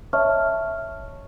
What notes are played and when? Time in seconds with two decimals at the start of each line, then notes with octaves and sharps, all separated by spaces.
0.13 C#5 D#5 E5 A5 C#6 F6